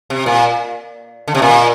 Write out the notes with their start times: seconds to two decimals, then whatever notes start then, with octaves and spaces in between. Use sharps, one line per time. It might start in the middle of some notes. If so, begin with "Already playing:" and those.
0.10 C3
0.26 A#2
1.28 D3
1.35 C3
1.42 A#2